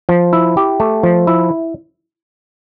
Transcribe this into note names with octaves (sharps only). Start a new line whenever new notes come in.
F3
E4
G4
A3
F3
E4